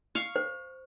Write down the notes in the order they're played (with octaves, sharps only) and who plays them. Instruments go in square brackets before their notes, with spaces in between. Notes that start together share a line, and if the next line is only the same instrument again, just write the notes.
[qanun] F5 C#6
[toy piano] C5